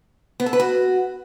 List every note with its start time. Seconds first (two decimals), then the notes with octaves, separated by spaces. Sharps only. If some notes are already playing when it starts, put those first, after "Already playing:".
0.40 B3
0.46 A4
0.53 B4
0.60 F#4